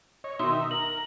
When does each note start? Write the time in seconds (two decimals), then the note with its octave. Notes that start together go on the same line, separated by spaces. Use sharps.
0.24 C#5 D#5
0.39 B2 D#3 D#4 E5 C6
0.71 A#4 A#5 F#7